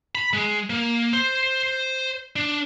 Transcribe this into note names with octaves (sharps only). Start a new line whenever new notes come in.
B5
G#3
A#3
C5
D4